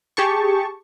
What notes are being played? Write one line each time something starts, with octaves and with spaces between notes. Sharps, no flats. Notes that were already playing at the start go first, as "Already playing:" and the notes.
G4 G#4 A5 C#6